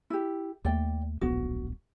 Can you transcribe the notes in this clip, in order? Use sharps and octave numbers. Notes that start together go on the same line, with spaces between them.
E4 G4
D#2 A3 D5 G5
D1 A#1 B3 F#4